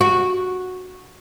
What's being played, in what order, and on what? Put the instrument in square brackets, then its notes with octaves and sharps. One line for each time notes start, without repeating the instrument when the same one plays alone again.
[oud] F#4